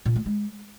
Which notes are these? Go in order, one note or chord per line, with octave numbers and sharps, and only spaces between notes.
A#2
A3
G#3